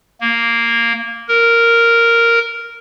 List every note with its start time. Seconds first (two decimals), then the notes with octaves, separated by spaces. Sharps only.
0.20 A#3
1.28 A#4